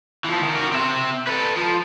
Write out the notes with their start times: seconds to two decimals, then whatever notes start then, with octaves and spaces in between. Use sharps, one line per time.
0.25 E3 F3
0.43 D#3
0.56 F#4 A#4
0.72 C4 E5
1.27 A4 B4
1.56 F3